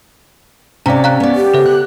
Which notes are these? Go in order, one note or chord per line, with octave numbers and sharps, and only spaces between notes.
C3 C#4 D5 F5 A#5
F5 A#5 F#6
B3 D5
G4
C#3 A4 C5 E5
F#6